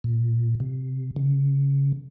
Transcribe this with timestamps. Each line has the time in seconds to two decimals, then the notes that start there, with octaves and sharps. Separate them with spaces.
0.04 A#2
0.60 C3
1.16 C#3